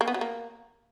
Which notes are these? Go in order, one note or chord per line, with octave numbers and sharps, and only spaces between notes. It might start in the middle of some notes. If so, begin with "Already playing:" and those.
A#3
B3
F#3
A#3